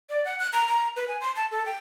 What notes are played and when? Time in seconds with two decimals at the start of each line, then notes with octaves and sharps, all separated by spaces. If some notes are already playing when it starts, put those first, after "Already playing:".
0.10 D5
0.25 F#5
0.39 F#6
0.53 A#5
0.68 A#5
0.96 B4
1.08 G#5
1.21 C6
1.36 A5
1.51 A4
1.66 G5